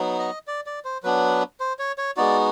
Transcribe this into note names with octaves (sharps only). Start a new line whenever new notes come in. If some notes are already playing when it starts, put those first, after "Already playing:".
Already playing: F#3 B3 D#4
D#5
D5
D5
C5
F#3 B3 D4 B4
C5
C#5
C#5
G#3 B3 D#4 F#4 D5